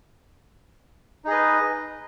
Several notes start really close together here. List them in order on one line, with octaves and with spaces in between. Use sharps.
D#4 G#4 D#5 B4